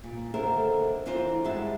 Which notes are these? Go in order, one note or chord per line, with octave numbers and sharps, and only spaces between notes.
A#2
D#2 D3 A4 A#4 C5 E5
E3 C4 D4 F4 A#4 C5
G2 G3 G#3 F#4 E5 A5